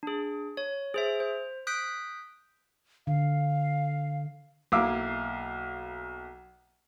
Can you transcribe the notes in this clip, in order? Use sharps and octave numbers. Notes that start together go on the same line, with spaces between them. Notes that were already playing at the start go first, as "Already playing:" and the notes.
D4 G#4
C#5
G#4 C5 E5
C5
D#6 F#6 G6 B6 D7
D3 F5
B1 A#3 E4 F5 D6 E6